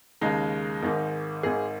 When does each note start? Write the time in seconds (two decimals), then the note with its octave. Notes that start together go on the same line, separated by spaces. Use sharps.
0.22 D#2 C#3 G#3 D#4
0.83 G#1 G#2 D#3
1.43 G#1 G#2 D#3 G#4